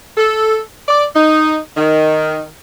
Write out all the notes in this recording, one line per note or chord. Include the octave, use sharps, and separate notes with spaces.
A4
D5
D#4
D#3